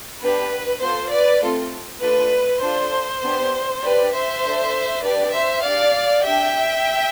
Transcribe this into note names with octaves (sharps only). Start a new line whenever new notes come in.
B3 D4 G4 B4
B3 F4 A4 C5
B4 D5
A3 C4 F4 A4
A3 D4 F4 B4
D4 F4 A4 C5
B3 D4 G4
D4 G4 B4 D5
C5 E5
D4 A4
D4 G4 B4 D5
C5 E5
D4 G4 D5 F5
D4 G4 E5 G5